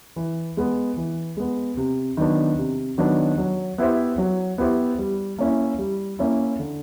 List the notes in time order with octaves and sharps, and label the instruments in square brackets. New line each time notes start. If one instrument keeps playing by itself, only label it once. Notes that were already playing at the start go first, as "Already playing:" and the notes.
[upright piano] E3
G#3 B3
E3
G#3 B3
C3
D#3 F#3 B3 D4
C3
D#3 F#3 B3 D4
F#3
B3 E4 G4 C5
F#3
B3 E4 G4 C5
G3
A#3 C#4 E4
G3
A#3 C#4 E4
D3